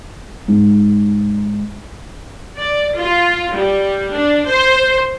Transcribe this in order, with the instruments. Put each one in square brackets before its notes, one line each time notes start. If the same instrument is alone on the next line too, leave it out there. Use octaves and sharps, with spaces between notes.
[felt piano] G#2
[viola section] D5
F4
G3
D4
C5